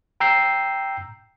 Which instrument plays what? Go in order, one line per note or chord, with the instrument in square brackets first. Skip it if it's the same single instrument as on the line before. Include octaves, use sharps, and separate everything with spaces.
[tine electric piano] G5 A#5 E6 G6 C7